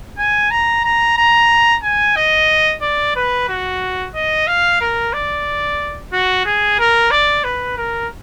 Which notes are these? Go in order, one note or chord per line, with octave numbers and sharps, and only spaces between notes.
G#5
A#5
A#5
A#5
G#5
D#5
D5
B4
F#4
D#5
F5
A#4
D5
F#4
G#4
A#4
D5
B4
A#4